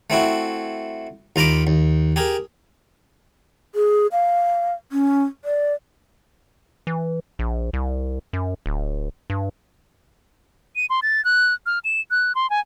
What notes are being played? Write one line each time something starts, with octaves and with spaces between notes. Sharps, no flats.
A3 C4 E4 F#4
D#2 F4 A#5 B5 D6
D#2
G4 G#4 A#4
G#4
F5
C#4
D5
E3
A#1
C2
F#2
D1
G2
D#7
C6
A6
F#6
F6
E7
F#6
C6
G#5